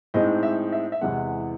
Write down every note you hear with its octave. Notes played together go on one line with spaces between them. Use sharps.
A2 G#3 C4 D#4 D#5
E5
E5
E5
E2 C3 E3 G#3 F#5